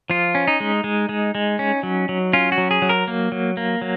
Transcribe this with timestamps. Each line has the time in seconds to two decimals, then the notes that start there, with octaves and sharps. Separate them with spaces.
0.10 F3 F4
0.35 C#4
0.48 D#4
0.60 G#3
0.84 G#3
1.09 G#3
1.35 G#3
1.59 C#4
1.83 F#3
2.09 F#3
2.33 C#4 F4
2.52 F#4
2.58 F#3
2.71 G#4
2.82 F#3
2.89 A#4
3.08 A#3
3.32 F#3
3.57 A#3
3.81 F#3